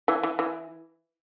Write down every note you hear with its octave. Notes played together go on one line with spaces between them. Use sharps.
E3
E3
E3